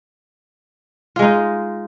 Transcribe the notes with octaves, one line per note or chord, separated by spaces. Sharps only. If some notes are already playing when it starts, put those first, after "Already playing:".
G#3 D#4 F4